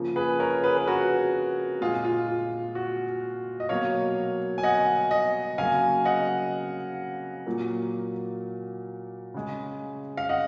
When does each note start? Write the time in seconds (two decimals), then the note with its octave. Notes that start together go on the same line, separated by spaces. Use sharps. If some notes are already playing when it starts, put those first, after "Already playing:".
Already playing: C#3 F3 A#3
0.16 G#4 B4
0.40 A#4 C#5
0.64 G#4 B4
0.77 B4
0.87 F#4 A#4
1.81 A#2 G#3 F4 G#4
2.04 F4
2.28 F4
2.75 F#4
3.60 D#5
3.69 B2 F#3 A#3 C#5 F5
4.58 G#5
4.63 D#5 F#5
5.11 D#5 F#5
5.58 C#3 F#3 A#3 F5 G#5
6.05 D#5 F#5
7.46 A#2 F#3 A#3
9.34 C#3 G#3
10.17 F5
10.29 D#5 F#5